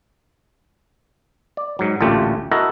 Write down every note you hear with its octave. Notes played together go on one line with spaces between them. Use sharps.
D5
G#2 F#3
A1 D2 A#2 A3 F4 G4
E4 F#4 A4 A#4 D#5